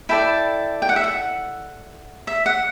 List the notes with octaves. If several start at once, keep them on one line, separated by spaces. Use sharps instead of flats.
E4 A4 D5 G5
G5
F#5
E5
F#5
E5
F#5